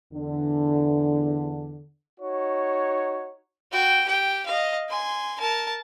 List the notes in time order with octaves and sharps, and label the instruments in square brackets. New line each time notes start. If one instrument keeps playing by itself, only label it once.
[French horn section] E2 D3
[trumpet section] D#4 F#4 C#5
[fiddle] F#4 G5
G4 G5
D#5 F5
G#5 C6
A#4 A5